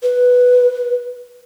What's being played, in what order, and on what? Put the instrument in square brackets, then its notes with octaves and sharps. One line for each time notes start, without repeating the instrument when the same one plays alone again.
[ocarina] B4